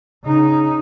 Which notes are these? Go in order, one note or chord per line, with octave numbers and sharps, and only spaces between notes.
C#3 D#4